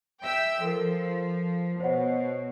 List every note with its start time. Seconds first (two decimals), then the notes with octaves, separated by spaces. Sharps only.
0.24 E5 G5 E6
0.61 F3 A4 A#4
1.80 B2 C5 C#5 F#5